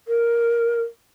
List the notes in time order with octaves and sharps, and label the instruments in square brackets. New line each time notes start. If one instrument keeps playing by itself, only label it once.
[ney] A#4